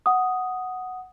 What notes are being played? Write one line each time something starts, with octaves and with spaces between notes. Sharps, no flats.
F#5 D#6